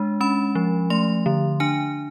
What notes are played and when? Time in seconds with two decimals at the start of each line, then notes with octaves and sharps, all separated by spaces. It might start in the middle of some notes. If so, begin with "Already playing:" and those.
Already playing: G#3 D4
0.21 C#4 B5
0.55 F3
0.90 A3 C6
1.26 D3
1.60 D4 G#5